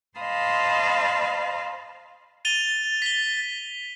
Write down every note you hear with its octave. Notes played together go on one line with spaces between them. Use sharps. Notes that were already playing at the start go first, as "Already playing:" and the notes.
C5 D#5 F5 A5 B5 C6
A6 D#7 F7 G7
B6 G7